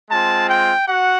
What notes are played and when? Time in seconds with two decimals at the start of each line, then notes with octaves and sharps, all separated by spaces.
0.10 G#3 C4 F4 A5
0.50 G5
0.88 F#4 F#5